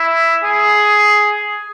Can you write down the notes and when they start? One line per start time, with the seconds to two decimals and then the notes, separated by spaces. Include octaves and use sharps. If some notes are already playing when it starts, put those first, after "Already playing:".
Already playing: E4
0.44 G#4